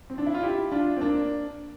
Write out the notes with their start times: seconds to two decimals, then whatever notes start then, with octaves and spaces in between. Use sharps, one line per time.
0.10 C4
0.18 D4
0.26 E4
0.34 F4
0.43 E4 G4
0.72 D4 F4
0.97 C4
1.01 A#3 D4